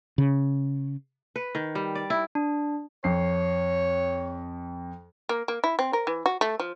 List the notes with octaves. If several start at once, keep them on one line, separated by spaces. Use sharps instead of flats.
C#3
B4
D#3
G3
D5
E4
D4
F2 C#5 C7
A#3
A#3
E4
C4
A#4
E3
F#4
A3
F3